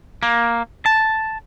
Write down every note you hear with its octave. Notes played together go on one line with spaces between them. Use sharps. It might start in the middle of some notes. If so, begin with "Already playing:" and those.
A#3
A5